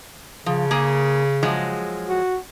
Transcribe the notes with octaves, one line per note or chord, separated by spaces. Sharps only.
C#3 F3
A#3 G#4
F3 F#3 G#3
F#4